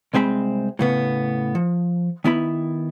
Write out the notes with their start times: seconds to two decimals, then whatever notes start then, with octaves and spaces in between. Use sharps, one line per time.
0.14 C2 G#3 C4 E5 B5
0.79 A2 C#3 B3
1.55 F3
2.24 D#3 B3 E4 B5